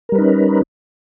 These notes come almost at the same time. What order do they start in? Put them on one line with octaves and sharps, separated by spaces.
A#4 G3 B4 D#4 C#4